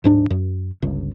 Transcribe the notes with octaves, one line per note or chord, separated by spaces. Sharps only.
D1 G#2 D4
F#2
G1 C#2